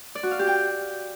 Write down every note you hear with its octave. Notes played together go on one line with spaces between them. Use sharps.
D5
F#4
F5
G4
G5